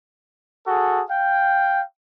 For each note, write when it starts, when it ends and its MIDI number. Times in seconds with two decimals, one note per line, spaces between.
0.67 1.03 66
0.67 1.03 68
0.67 1.03 69
1.11 1.82 77
1.11 1.82 79